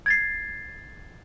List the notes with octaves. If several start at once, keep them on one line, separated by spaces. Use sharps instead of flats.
G#6 A6 C7